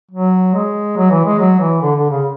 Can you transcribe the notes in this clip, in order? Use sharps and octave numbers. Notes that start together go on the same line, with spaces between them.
F#3
G#3
F#3
E3
G#3
F#3
E3
D3
D3
C#3